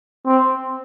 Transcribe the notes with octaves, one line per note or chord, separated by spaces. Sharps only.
C4